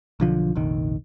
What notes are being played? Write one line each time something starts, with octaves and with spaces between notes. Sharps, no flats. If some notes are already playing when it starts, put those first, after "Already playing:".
B1 D3 F3
F1 A#1 D#3